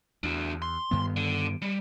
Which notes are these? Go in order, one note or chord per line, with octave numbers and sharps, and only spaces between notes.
E2 D4 F#4
C6
G2 D#3 B3
D3
G3